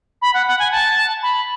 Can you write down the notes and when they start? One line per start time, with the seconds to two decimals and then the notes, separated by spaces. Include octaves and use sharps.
0.22 B5
0.34 F#5
0.47 F#5
0.59 G#5
0.72 A5
1.23 B5